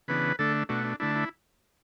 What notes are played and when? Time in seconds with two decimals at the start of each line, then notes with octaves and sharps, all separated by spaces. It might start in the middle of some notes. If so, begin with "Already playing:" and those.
0.08 C#3 E3 B3 D4 B4
0.39 D3 A3 D4 A4
0.69 B2 A3 D4 F#4
0.84 D4
1.00 D3 A3 D4 E4
1.15 E4